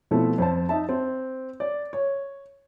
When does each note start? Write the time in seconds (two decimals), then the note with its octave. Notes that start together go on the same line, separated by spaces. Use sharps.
0.11 B2 F3 A3 C4 E4 A4
0.38 F2 C5 A5
0.69 D#4 E5 A5
0.89 C4
1.60 D5
1.93 C#5